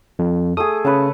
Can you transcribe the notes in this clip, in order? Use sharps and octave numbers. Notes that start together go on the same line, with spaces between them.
F2
A3 G#4 D#6
C#3 B4 C#5 A5